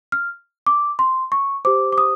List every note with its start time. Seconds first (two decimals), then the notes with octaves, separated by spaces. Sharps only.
0.12 F6
0.66 D6
0.99 C6
1.32 C#6
1.65 G4 C5 D6
1.92 D6
1.98 D#6